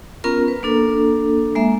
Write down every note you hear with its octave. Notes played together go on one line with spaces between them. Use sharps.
B3 C#4 F4 A#4 A#5
B4
A#3 D4 A4
G#3 A#3 E5